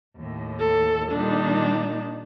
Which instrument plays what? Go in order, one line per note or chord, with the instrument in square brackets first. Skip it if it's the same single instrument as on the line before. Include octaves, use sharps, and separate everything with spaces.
[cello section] D#2 A2
[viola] A4
[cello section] A#2 D#3 G3 [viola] D4 D#4